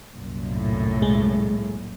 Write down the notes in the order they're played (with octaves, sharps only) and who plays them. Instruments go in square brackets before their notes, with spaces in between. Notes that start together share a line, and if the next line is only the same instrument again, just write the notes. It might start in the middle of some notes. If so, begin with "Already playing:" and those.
[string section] C2 F#2 A#2
[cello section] A2
[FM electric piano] G#3